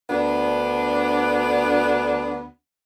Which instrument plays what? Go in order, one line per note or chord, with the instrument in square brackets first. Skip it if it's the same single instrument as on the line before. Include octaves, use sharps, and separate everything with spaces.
[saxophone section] D2 B3 D4